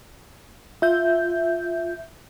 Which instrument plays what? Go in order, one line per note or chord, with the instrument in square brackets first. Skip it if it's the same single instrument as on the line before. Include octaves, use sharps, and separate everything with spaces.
[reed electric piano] F4 [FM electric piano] E5 G6